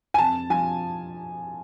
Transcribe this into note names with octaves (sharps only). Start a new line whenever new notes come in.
G#5
F2 A5
F3 G#5